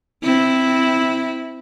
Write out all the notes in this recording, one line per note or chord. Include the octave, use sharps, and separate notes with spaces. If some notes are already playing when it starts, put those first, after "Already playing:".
C4 E4